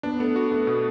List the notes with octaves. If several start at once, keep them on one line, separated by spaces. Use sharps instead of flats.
B3 D4
A3 B3
F#4
A3 B3
B2